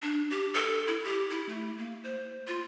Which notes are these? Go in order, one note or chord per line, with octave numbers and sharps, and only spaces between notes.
D4
G4
A4
E4
G4
E4
A3
A#3
C5
F4